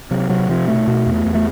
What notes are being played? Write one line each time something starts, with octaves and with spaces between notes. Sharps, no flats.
C3 F#3
C3 F#3
C3 F3
B2 A3
B2
E2
E2
A3